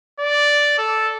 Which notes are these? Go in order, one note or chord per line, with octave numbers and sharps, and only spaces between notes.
D5
A4